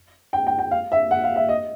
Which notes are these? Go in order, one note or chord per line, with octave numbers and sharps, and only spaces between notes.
G5
G5
G5
F5
E5
F#5
F5
E5
D#5